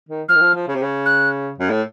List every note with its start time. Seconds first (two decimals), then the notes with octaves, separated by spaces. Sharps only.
0.09 D#3
0.29 F3 F6
0.35 D#3
0.41 F3
0.54 F3
0.68 C#3
0.75 C3
0.82 C#3
1.06 F#6
1.58 F#2
1.70 A2